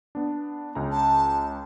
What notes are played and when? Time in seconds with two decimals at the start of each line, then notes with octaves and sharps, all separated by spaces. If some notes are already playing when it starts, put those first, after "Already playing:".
0.15 B3 D4
0.75 C#2 C#4 A#5
0.91 A5